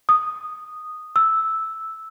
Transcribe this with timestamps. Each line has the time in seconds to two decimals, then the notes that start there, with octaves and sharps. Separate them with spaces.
0.09 D#6
1.16 E6